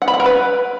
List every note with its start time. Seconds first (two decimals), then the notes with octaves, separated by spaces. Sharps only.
0.02 F#5
0.08 B5
0.14 F#5
0.20 A#4
0.26 B4